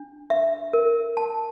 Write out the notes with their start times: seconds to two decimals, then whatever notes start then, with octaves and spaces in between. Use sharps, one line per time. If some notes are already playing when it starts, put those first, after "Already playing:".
Already playing: D4
0.30 E5
0.73 A#4
1.17 A5